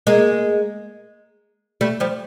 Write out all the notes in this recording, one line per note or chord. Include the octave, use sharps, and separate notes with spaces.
G#3 A#3
G3 A3
F3 G3